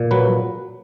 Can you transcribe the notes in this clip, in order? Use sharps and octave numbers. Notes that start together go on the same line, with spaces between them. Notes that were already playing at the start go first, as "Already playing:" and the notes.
Already playing: A#2
F#3 B4